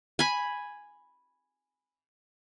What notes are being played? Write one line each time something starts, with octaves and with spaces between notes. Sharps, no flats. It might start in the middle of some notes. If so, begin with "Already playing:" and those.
G#5 B5